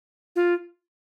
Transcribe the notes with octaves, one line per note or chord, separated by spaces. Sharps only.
F4